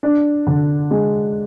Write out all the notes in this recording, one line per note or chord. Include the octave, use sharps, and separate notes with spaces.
D4
D3
G#3